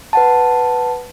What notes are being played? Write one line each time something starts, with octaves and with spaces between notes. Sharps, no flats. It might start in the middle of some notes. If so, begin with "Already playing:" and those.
B4 F#5 A5